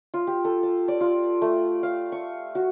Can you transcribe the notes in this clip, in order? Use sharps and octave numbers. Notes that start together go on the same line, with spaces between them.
F4
G4
A4
A5
D5
F4
A3
F5
C#6
F#4